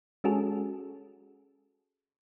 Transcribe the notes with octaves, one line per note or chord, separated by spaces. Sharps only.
G#3 C#4 F#4 G#4 A4